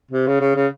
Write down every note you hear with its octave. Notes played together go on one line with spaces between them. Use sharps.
C3
C#3
C#3
C#3